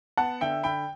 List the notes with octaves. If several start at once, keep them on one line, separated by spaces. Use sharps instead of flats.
B3 F#5 A5
D3 E5 G5
D3 G5 B5